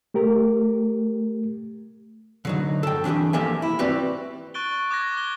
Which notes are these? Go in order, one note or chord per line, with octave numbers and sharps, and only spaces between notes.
A3 G4 A#4
D3 F#3 D#4
A4 G5
E3 D4 F4 G4 G#4
F3 A#3 G4 A4 E5 G#5
E4
C4 F#4 G4 B4 D5
C#6 F#6 A6 D7 G7
D6 F#6 G#6 A#6
G#6 G7